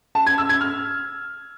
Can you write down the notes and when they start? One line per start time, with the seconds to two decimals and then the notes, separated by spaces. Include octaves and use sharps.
0.15 A5
0.26 G#6
0.38 E6
0.49 G#6
0.61 F6